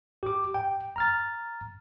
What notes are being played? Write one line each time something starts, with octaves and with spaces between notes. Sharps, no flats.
G4 D6
G5
A#5 F6 A6